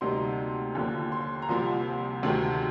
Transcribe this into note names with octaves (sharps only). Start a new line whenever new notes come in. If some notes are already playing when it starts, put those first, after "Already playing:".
D2 C3 G3 A#3 D#4 C6
D#2 D3 F3 A#3
C6
A#5
C2 C3 F3 A#3 C6
D2 C3 D#3 G#3